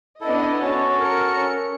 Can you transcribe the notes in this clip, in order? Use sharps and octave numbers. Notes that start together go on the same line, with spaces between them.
B3 D4 E4 A4 D#5
C#4 F#4 A4 C#5 A5
A#4 C#7
C#4